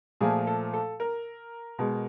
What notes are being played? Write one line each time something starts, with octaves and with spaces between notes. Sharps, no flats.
A#2 F3 A3 G#4
A4
A4
A#4
B2 G#3